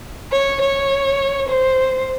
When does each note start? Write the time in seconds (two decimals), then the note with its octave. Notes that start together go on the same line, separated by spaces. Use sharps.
0.32 C#5
0.61 C#5
1.48 C5